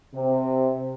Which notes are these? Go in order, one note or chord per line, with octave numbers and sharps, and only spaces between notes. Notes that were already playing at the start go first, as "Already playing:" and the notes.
C3